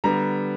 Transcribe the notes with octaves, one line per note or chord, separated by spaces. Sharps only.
D3 G3 B3 A#5